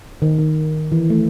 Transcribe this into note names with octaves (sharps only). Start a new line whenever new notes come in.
D#3
D#3
E3
A3